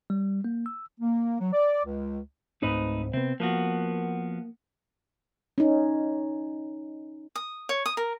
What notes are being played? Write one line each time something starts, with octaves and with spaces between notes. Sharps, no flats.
G3
A#3
E6
A#3
F#3
D5
C#2
C#2 G#2 A3 C4 D#4 B4
C3 B3 C4
F3 A#3 B3 F#4
C#4 D#4
D#6
C#5
D#6
A#4